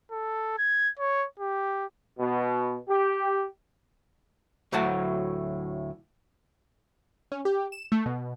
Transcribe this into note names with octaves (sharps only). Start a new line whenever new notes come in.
A4
G#6
C#5
G4
B2
G4
D2 A2 F#3 F#5 A5
C#4
G4
E7
A3
B2